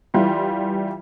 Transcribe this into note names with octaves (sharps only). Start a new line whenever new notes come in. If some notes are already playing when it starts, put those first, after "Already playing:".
E3 G3 F4